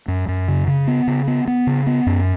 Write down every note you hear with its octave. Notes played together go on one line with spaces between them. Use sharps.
F#2
F#2
C#3
C#3
B3
C#3
B3
B3
C#3
B3
F#2